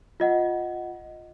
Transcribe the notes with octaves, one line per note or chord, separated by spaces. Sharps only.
F4 D#5 F#5